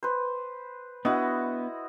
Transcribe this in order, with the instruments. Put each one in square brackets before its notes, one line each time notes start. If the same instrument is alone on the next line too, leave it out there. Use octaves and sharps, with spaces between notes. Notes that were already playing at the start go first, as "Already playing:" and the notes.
[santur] B4 C5
[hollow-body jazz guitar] B3 D4 B4 [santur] E4 D#5 [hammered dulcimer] F#4